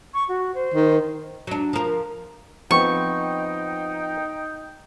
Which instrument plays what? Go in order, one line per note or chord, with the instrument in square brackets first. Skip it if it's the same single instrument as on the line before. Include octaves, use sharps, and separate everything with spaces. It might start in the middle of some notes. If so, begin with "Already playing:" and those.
[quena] C#6
F#4
C5
[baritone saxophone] D#3
[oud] F#3 D4
F3 A#4
[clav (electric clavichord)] F3 B3 C4 [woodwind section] D#4 G5 [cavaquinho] C#6